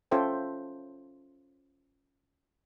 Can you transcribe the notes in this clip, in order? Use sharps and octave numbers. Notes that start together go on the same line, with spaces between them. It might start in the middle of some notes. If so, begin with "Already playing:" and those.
C#4 F4 A4 C5 E5 G5